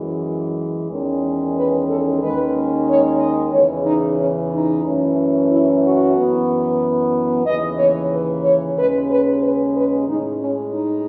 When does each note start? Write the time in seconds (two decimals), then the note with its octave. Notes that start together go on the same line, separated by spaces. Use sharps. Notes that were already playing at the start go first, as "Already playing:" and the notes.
Already playing: F#2 E3 G#3
0.91 E2 D#3 G#3 C#4
1.57 B4
1.90 A4
2.22 D#2 D#3 G#3 C#4 B4
2.88 C#5
3.20 D#5
3.53 E2 C#3 E3 C#5
3.86 D#4
4.19 C#4
4.52 D#4
4.84 F#2 E3 A3 C#4
5.50 E4
5.83 F#4
6.16 F#2 E3 B3
7.46 D#2 C#3 E3 D#5
7.78 C#5
8.11 B4
8.44 C#5
8.77 D#2 C#3 G#3 C#4 B4
9.10 B4
9.42 B4
9.76 B4
10.07 A2 G#3 C#4 D#4
10.41 C#4
10.73 D#4